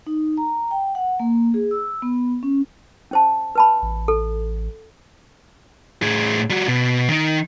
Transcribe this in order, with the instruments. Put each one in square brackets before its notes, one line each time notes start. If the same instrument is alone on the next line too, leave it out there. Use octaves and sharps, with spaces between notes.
[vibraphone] D#4
A#5
G5
F#5
A#3
G#4
E6
B3
C#4
[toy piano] C#4 C5 A5
B4 A5 B5
[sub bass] A1
[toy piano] A4
[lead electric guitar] A2 G#4
G3 F#4
B2
D#3 D#4